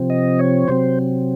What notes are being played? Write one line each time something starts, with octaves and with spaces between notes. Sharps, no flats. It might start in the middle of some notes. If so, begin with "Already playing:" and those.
Already playing: C3 F3 C4
D#5
C#5
C3 F#3 C4 C5